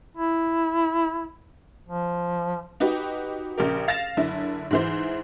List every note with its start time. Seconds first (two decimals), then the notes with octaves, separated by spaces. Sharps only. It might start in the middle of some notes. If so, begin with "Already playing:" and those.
0.17 E4
1.89 F3
2.80 D#4 F#4 G4 B4
3.58 A#1 C#3 G4 A#4
3.88 F5 A6 A#6 E7 F7
4.17 F#1 D3 E4
4.71 G#2 E3 C5